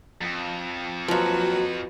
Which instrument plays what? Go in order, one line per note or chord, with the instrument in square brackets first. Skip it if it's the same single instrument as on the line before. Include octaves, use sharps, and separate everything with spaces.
[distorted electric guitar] F2
[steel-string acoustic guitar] D#2 F#3 [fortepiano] F3 [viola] F#4 B4